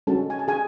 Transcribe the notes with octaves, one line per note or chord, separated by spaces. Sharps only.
G#3 C#4 F#4 A4 A5
G#5
A5
G#4 G#5